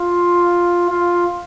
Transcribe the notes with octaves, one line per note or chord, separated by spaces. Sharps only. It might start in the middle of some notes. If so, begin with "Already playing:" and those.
Already playing: F4
F4